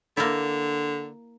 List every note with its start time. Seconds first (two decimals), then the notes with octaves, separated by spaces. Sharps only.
0.17 D3 A#3 E4